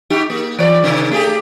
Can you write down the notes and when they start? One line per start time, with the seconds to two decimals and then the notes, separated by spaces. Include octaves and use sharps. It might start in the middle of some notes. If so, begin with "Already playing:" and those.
0.10 D#4 F#4 G4
0.30 A#3
0.59 E3 C#5 D5
0.82 G#2 C3 D#3
1.12 A3 G4 G#4